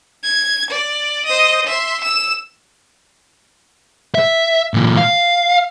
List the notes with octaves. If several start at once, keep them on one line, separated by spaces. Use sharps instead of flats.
G#6
D5
C5 D#5
E5 C6
E6 E7
E5
A#2 E3
F5